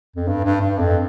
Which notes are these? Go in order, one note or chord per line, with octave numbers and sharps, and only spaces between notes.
F2
G2
G2
G2
F2